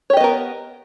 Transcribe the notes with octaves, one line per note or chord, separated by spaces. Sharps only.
B3 G4 A#4 C#5 D#5